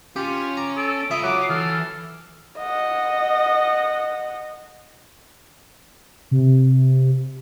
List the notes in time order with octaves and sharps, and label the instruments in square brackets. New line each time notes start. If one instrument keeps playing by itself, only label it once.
[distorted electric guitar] C#4 [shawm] F4 [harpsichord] G4
[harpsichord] A#5 [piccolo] D6
[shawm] A4 [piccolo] D7
[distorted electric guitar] F4 B4 [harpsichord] E5 [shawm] D#6
[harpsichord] F#3 [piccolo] D6
[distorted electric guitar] E3 [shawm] A4 [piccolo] F6
[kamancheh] D#5 F#5
[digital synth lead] C3